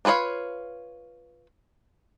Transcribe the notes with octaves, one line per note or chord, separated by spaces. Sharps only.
D4 F4 B4 C#5 F5